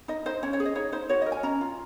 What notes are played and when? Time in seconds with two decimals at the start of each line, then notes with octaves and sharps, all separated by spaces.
0.08 D#4 D#5
0.26 D#4 C5
0.43 C#4 C#5
0.53 C#5
0.60 G#4
0.65 D#5
0.75 D#4 C#5
0.92 D#4 C5
1.09 F#4 C#5
1.22 D#5
1.26 A#4
1.32 G#5
1.43 C#4 A#5
1.61 F4